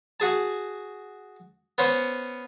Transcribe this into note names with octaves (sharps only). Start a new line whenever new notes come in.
F#4 G#4 A5
B3 C#4 C5